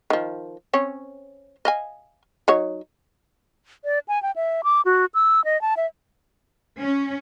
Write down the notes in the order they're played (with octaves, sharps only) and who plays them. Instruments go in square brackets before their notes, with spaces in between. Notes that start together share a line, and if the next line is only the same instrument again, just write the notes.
[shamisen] D#3 F3
C4 C#4 C#5
D#5 F5 G#5
F#3 D#4 C#5
[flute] D5
G#5
G5
E5
D6
F#4
E6
D#5
A5
E5
[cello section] C#4